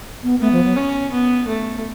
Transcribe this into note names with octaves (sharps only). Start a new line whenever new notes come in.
B3
A3 B3
F3
F#3
C#4
B3
A3